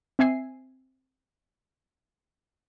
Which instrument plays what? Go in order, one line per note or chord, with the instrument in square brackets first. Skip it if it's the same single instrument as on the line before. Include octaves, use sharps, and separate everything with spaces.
[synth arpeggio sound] C4 E5 G#5 C7